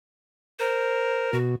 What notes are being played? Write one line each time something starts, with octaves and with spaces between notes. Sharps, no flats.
A#4 C5
B2 F#4